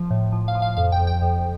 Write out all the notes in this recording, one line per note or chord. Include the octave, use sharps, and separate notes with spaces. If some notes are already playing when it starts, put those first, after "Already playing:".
Already playing: F3
A2
F3
F5
F3
F5
F2 F5
G5
F2
G5
F2